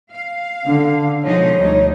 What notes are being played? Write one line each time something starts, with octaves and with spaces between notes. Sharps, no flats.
F5
D3 D4
B1 F3 G#3 D#4 C#5
D2 G3 D#4